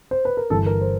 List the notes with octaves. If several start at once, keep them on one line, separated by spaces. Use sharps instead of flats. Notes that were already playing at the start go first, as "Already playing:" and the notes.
C5
B4
A#4
G1 G2 E3 G3 A4
A#4
C5